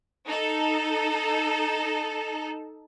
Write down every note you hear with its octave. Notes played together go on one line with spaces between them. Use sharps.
D#4 A4